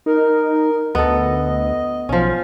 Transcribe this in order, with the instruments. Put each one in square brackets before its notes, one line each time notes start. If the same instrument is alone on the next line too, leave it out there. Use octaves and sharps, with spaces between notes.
[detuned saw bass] D#4 [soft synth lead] A#4
[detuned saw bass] D2 [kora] B3 A4 [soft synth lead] D#5
[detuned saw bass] B1 [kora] F3 C#4